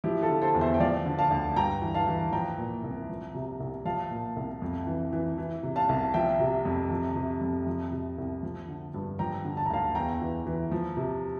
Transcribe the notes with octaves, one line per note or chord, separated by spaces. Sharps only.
F3 E4 G4
F4 A4
D3
A4 C5
E2
C5 E5
G5
F3 D5 F5
D3
F5 A5
D2
G2 G5 A#5
E3
F5 A5
E3
F3 G5 A#5
A#2
C2
F3
C3
C2
F3 F5 A5
A#2
C2
F2
E3
E3
E3
C3
F5 A5
C2
F3 E5 G5
C3
F2
F3
C3
F2
F3
C3
C2
F3
D3
G2
F3 G5 A#5
D3
A5
A#5
D2 F5 A5
E2 G5 A#5
E3
E3
F3
C3